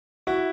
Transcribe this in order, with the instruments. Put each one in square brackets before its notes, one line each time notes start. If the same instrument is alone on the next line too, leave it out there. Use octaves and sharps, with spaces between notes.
[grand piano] E4 [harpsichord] F#4